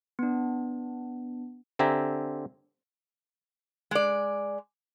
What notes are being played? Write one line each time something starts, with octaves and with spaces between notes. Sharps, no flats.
B3 D4
D3 C4 G4 E5 G#5 A#5
G#3 D5